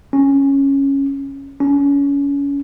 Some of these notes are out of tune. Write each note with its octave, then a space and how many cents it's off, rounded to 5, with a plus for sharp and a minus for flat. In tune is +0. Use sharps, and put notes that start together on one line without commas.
C#4 -5
C#4 +30